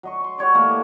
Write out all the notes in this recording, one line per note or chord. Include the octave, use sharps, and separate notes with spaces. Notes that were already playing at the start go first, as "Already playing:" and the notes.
F#3 D#5 C#6
C6 C#6
F#4 G4 C#5 D5
E3 A3 A#3